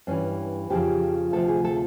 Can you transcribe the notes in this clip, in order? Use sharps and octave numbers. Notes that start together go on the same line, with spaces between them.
G2 E3 C#4
F2 C#3 F3 G4
D2 C3 F3 A4
G#4
A4